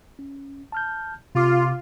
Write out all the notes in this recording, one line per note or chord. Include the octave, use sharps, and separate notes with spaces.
C#4
A5 F6 G6
C3 F4 D6